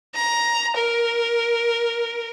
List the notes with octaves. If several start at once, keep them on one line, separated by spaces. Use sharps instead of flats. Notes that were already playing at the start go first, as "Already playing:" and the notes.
A#5
A#4